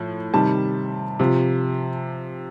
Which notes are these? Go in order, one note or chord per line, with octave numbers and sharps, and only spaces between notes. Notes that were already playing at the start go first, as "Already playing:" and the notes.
Already playing: A2 F3
C3 D#3 G3 A5
C3 F3